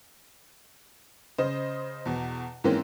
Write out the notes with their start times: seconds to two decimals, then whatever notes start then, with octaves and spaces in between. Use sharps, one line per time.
1.38 C#3 C5 D#5
2.06 E2 B2
2.64 G#2 E3 A#3 C4 C#4